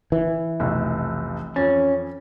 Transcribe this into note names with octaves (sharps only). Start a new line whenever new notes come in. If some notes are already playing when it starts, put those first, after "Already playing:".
E3
F1 B1
F2 C#4 A6